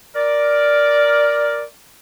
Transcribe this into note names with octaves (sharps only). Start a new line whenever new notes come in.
A#4 D5